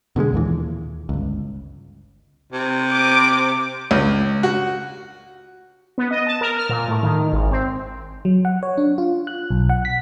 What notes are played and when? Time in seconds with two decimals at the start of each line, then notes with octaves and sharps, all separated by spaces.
0.16 B2 D3 F#3 G#3
0.33 D#2 A#2 E3
1.09 G1 C#2
2.52 C3
2.91 D6
3.91 C#2
4.43 F#4
5.98 B3
6.11 D#5
6.27 A5
6.41 A#4
6.57 F6
6.69 A#2
6.88 A2
7.03 D#3
7.32 G#1
7.51 C4
8.25 F#3
8.45 F#5
8.63 C#5
8.78 D4
8.98 F4
9.27 F#6
9.51 B1
9.69 F#5
9.85 B6